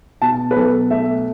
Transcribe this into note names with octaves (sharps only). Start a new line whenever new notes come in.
B2 A5
B4
B1 A4
A3 E5